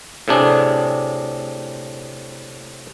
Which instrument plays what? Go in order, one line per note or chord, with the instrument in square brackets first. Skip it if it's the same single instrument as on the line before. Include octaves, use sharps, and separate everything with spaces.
[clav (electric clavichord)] A2 C3 D4 G#4